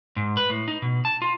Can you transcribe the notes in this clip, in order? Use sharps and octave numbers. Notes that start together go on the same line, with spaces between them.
G#2
B4
A2
D#4
B2
A5
F4